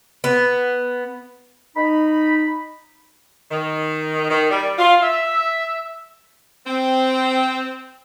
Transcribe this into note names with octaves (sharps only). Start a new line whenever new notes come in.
B3
D#4 B5
D#3
D#3
G3
F4
E5
C4